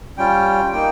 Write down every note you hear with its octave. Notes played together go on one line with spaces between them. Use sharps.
G3 C#4 F4 G5
A#3 D#4 G5